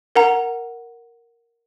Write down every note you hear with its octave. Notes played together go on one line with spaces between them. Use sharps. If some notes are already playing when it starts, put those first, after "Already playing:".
A#4 F#5 A#5